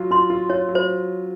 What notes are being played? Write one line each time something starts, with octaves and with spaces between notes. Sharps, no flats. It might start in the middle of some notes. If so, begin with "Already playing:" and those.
Already playing: F#3 F4
F4 C6
F4
F4 C#5
F#3
C5